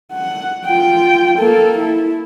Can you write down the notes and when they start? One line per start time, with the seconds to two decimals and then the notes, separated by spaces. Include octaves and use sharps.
0.12 F#5
0.65 F4 G5
1.38 A#3 A4
1.78 E4